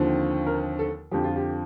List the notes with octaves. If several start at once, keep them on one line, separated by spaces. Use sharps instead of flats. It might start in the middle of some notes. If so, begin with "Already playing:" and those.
Already playing: D#2 D3 F3 C4
A#4
A4
F2 D3 F3 G4
F4
G4